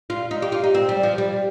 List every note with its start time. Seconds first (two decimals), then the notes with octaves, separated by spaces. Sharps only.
0.10 F4
0.31 D#4
0.42 G4
0.52 F4
0.64 D#4
0.75 C4
0.89 G3
1.03 F3
1.18 G3